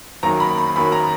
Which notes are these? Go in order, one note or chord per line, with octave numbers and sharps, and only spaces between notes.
F#2 D#3 F#3 A#3 A#5
B5
B5
F#2 D#3 F#3 A#3 B5
A#5